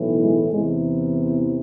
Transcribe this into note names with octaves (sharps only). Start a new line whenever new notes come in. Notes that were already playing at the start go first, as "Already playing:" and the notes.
Already playing: B1 A2 E3
G#3
E2 C3 E3 G#3